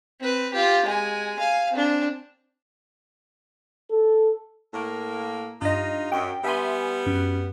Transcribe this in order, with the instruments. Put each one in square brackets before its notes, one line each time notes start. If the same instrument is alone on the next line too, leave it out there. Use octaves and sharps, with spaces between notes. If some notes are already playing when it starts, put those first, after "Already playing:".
[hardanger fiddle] C4 B4
F4 G4
G#3 G#5
F5 G#5
C4 D4
[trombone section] A4
[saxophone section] A2 A#3
[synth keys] G2 D#5 [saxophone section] D#4 F4
[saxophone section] F#2 [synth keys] G5
[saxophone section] G3 B3 [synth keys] E5 G#5 C6
[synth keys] F#2